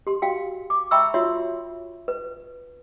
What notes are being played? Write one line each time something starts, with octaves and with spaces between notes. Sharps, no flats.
G4 C6
F#4 F5 G5
D6
E5 G5 A#5 B5 C#6 E6
F4 F#4 C#5 E5 C6
B4